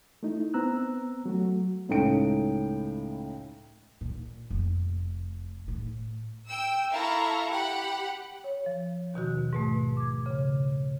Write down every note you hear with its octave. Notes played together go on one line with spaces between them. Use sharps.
A3 D#4 E4
B3 C4 A#5 E6 F#6
F#3 A3 F#4
C#2 A2 D#4 A4 G5 D7
A#2
F1
A2
G5 E6
E4 A4 E5 F5 A#5 C#6
G4 F#5 B5
C#5
F3
D#2 B2 D#3 F#4
G#2 B2 A3
D6 G#6
C#3